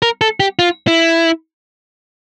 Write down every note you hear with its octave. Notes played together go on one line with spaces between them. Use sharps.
A#4
A4
G4
F4
E4